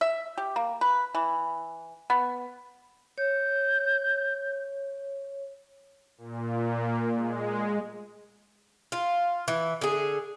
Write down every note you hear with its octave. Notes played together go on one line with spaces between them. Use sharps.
E5
G4
A#3
B4
E3
B3
C#5 G6
A#2
G#3
F4
E3
D3 G#4